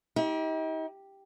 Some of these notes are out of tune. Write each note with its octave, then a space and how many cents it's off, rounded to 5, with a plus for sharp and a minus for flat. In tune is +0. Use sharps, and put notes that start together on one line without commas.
D#4 +40 G4 +0